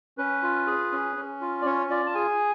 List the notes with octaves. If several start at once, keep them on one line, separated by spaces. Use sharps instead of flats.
C#4 B4
F4
G#4
C#4
C#4
F4
D5
C#4 C#5
F4 D5
A5
G#4 G#5